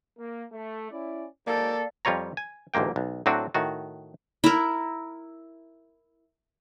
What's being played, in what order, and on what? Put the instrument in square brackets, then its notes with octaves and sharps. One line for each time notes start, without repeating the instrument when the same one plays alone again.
[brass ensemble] A#3
A3
C#4 E4 D5
[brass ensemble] G#2 F#3 G5 [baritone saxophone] A#3 [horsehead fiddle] A4 [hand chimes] D5 F5
[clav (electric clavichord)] F2 G3 F4 C#5 A#5
G#5
A1 D2 G#2 A#3 G5
B1
A2 F#3 C4 D4 F#4
A2 D#3 F#4
[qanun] E4 A#4